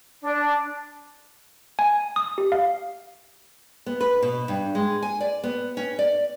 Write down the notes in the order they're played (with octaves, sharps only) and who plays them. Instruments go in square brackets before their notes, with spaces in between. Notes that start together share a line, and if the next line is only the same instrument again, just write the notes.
[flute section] D4
[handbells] G#5
D#6
G4
F5
[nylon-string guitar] B3
B4
B2
G2
G#3
G#5
D5
B3
C#4
D5